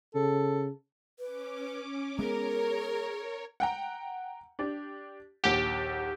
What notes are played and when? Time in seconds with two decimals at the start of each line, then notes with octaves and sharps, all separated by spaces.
0.15 C#3 A4
1.19 C#4 B4 D6
2.19 G#3 B3 G#4 A#4 C#5
3.60 F#5 G5 A#5
4.59 D4 G4
5.44 A#1 D#2 G4 F#5